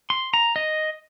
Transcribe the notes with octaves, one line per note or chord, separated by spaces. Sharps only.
C6
A#5
D#5